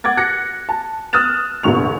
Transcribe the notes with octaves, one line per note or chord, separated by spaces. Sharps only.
F#5 D6 G#6 A6
F#6 A#6 C#7
A5
D#6 F6 F#6 A6 E7
F1 A#1 E2 D3 C#6 F7